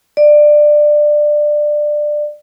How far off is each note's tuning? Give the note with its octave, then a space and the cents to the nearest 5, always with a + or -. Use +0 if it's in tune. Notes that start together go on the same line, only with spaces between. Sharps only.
D5 +15